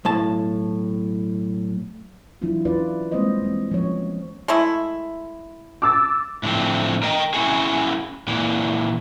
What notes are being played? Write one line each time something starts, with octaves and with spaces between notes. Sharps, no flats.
B1 A2 A5
E3 F#3 D4 E4 F4
C#4 D4 E4 F4 B4 D5
G3 G#3 A#3 C4 C5 D#5
E3 G#3 C4
F3 B3 C#4 C#5
G#3 A3 E4
D6 E6 A6
A2 D3 F3 C4
A#4 D#5 G5
C#4 E4 F#4 G#4
A#2 E3